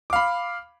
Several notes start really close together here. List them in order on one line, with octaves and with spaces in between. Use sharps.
D6 F5 B5